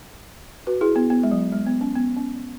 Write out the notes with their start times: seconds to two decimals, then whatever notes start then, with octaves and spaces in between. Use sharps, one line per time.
0.67 F#4 B4
0.81 E4 G#4
0.95 B3 E4
1.10 B3
1.23 G#3
1.31 F#3
1.52 G#3
1.66 B3
1.81 C#4
1.96 B3
2.17 C#4